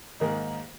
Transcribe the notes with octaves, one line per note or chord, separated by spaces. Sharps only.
G#2 D#3 A#3 D#4